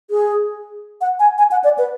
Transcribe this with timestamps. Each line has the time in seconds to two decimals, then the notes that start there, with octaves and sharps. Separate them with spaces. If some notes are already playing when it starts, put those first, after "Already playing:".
0.10 G#4
1.01 F#5
1.19 G#5
1.38 G#5
1.51 F#5
1.64 D5
1.78 B4